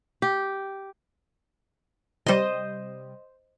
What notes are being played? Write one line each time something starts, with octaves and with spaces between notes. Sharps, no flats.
G4
C3 G3 C5 D#5